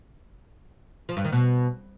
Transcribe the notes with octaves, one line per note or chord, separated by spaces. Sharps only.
F3
G2
D#3
B2